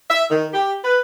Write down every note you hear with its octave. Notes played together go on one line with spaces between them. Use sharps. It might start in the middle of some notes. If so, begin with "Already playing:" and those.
E5
D#3
G4
B4